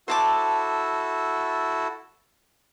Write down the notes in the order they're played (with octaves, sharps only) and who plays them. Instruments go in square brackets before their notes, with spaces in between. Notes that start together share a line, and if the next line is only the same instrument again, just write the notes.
[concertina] E4 F#4 A4 [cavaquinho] C5 A5 D6